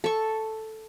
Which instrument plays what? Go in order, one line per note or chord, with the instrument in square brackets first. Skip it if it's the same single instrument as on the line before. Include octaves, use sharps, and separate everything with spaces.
[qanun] A4 C#6